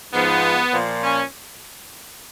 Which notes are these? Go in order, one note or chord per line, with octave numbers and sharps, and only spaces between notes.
G#2 F3 B3
A#2 F3
C#4